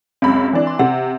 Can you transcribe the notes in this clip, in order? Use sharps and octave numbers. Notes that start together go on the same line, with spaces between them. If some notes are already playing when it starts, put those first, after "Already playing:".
C#2 F#2 C4 B5
E3 D4
C6
C3 F#5